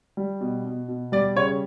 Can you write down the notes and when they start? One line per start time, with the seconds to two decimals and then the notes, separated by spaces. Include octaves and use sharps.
0.17 G3
0.41 B2
0.65 B2
0.88 B2
1.12 G3 D5
1.36 C#3 C#5